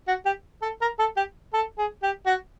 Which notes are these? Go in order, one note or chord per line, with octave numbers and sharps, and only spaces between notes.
F#4
G4
A4
A#4
A4
G4
A4
G#4
G4
F#4